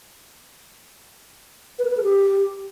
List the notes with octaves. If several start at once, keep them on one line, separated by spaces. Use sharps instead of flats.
B4
A#4
B4
A4
G4